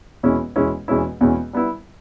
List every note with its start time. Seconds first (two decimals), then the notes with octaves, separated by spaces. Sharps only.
0.23 E2 B2 G#3 C#4 E4
0.56 E2 B2 G#3 C#4 E4
0.88 E2 B2 G#3 C#4 E4
1.21 E2 B2 G#3 C#4 E4
1.53 G3 B3 E4